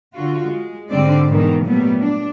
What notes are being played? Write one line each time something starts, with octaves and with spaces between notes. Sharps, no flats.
D3 F4 F#4
G#3
G#2 D3 G3 C4 D4 D5
G#2 B2 D#3 E3
A#2 F#3 G3 A3 B3
D4